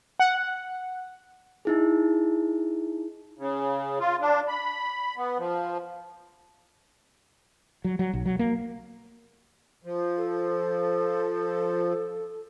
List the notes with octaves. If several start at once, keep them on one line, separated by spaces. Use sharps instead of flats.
F#5
D#4 E4 G#4
C#3
F4
D4
B5
B3
F3
F#3
F#3
B1
F#3
A#3
F3
A4